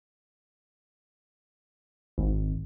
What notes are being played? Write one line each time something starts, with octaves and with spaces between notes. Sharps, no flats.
G#1